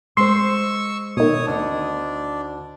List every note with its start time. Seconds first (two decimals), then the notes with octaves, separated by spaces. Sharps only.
0.17 G#3 C5 C6 C#6 E6
1.17 B2 D#3 C#5 D#6
1.47 D2 D4 D#4